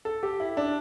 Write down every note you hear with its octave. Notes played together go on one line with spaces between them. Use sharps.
A4
G4
E4
D4